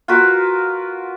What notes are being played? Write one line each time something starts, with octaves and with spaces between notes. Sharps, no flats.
F4 F#4 A#4 B4